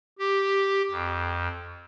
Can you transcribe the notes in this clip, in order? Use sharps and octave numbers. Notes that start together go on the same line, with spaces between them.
G4
F2